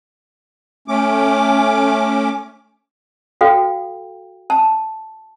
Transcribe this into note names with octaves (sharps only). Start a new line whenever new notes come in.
A3 C#4 D6
F#4 A4 F5 G5
A5